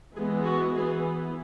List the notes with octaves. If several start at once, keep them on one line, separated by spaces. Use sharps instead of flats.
E3 G#3 B3 G#4
F#4
E3 B3 G#4